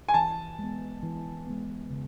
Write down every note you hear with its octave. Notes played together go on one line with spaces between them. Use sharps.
G#5
E3 A5
G#3 B3
E3
G#3 B3
C#3